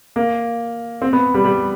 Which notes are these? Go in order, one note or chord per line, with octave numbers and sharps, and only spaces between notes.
A#3
C4
B3
G3
G3